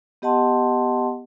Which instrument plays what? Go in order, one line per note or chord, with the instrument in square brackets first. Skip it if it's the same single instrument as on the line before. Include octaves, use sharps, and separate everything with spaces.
[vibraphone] B3 G4 D#5 F#5 A5 C6